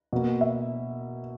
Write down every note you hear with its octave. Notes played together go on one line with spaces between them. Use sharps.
B2 A#3
E5